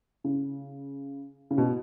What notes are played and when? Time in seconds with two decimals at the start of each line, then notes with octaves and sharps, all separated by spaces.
0.24 C#3
1.51 C#3
1.58 B2